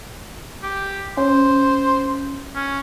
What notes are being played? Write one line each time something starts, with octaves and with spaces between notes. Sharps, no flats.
G4
C#4 C5
C#4